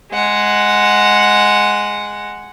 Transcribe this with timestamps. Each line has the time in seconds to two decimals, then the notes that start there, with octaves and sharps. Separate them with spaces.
0.12 G#3 F#5